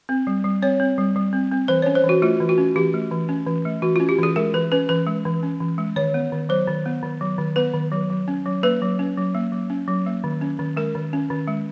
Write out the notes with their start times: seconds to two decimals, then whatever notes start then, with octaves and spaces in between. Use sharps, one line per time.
0.09 C4
0.27 G3
0.44 G3
0.62 C4 C#5
0.80 C4
0.98 G3
1.16 G3
1.33 C4
1.52 C4
1.68 E3 C5
1.82 C#4 C#5
1.95 C5
2.04 E3 F#4
2.22 A3 F4
2.40 E3
2.49 F#4
2.58 C#4
2.76 E3 G4
2.94 A3
3.12 E3
3.29 C#4
3.47 E3
3.65 A3
3.82 E3 F#4
3.96 C#4 F4
4.09 G4
4.19 E3 G#4
4.36 G#3 A#4
4.54 E3 B4
4.72 C#4 B4
4.89 E3 B4
5.07 G#3
5.25 E3
5.43 C#4
5.60 E3
5.78 G#3
5.96 D#3 C#5
6.14 B3
6.32 D#3
6.49 F#3 C5
6.67 D#3
6.86 B3
7.03 D#3
7.21 F#3
7.38 D#3
7.56 B3 B4
7.74 D#3
7.92 F#3
8.10 F#3
8.28 C#4
8.46 F#3
8.63 A#3 B4
8.82 F#3
8.99 C#4
9.17 F#3
9.35 A#3
9.52 F#3
9.70 C#4
9.88 F#3
10.06 A#3
10.24 D#3
10.41 C#4
10.59 D#3
10.77 G#3 A#4
10.95 D#3
11.13 C#4
11.30 D#3
11.48 G#3